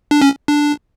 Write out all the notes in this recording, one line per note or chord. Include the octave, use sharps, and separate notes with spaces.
D4
C#4
D4